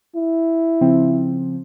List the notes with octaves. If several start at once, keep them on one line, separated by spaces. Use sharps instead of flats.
E4
C#3 F3 C4